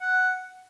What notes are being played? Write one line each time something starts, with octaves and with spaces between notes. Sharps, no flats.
F#5